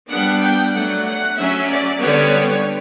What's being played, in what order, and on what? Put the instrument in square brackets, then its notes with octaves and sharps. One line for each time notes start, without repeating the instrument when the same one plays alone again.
[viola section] G3 B3 D4 F#5
G5
F#3 A3 D4 F#5
F#5
F#3 C#4 E5
D5
D3 G3 B3 C#5